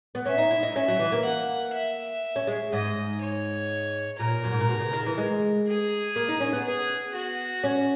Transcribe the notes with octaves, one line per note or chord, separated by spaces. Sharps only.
B3
C#4 E5
D#4
E4
D#4
C#4 E5
F#3
E3
A#3
F#5
E5
C#4
G#3
G#2 D#5
C#5
A#2 A#4
F#2
G#2
A#2
B2
C#3
D#3
E3
G#3
G#4
A#3
D#4
C#4
B3
G#4
F#4
C#4